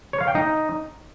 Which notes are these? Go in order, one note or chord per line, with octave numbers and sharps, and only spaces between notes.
C#5
F5
G5
D#4